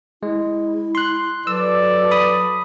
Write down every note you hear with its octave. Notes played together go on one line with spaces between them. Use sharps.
G#3 E4
C6 F#6
F#3 A4 B4 D5 E6
B5 D#6